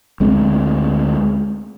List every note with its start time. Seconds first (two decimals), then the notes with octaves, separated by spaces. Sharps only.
0.20 D2 G#3 C4